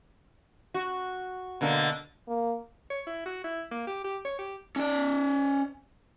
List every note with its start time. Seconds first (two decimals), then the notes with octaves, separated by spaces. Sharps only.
0.74 F#4
1.61 B2 D3 A#3
2.28 A#3
2.90 C#5
3.07 E4
3.25 F#4
3.44 E4
3.71 A#3
3.87 G4
4.04 G4
4.25 C#5
4.39 G4
4.76 C#4 D5